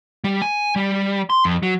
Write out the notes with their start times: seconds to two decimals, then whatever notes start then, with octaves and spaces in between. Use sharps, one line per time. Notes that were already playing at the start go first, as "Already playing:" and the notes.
0.24 G3
0.42 G#5
0.76 G3
1.30 C6
1.45 F2
1.63 F#3